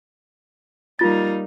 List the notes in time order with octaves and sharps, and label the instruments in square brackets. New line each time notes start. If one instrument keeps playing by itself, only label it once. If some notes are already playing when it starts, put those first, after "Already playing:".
[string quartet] G3 A#3 D#4 [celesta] F4 A6